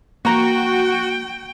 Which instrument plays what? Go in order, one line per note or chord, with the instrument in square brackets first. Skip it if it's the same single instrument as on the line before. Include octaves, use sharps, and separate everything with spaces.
[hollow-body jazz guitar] A#3 A#5 [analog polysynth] F#4 [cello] G5